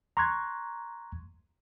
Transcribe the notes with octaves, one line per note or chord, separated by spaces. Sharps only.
A#5 C6 C#6 F#6 G#6